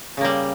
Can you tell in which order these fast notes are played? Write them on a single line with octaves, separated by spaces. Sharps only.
C#3 A#3 G3